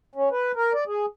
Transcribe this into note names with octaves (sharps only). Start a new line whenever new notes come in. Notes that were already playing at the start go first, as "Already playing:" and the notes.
C#4
B4
A#4
D5
G#4